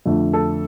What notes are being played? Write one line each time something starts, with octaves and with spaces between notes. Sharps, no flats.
F2 D3 A3
A4